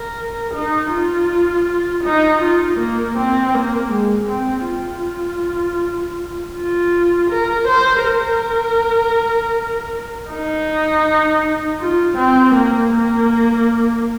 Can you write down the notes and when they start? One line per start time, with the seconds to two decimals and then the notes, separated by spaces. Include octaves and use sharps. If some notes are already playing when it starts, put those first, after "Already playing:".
Already playing: A#4
0.54 D#4
0.92 F4
2.04 D#4
2.41 F4
2.79 A#3
3.18 C4
3.54 A#3
3.93 G#3
4.29 C4
4.67 F4
6.55 F4
7.30 A#4
7.67 C5
8.05 A#4
10.30 D#4
11.80 F4
12.17 C4
12.54 A#3
12.93 A#3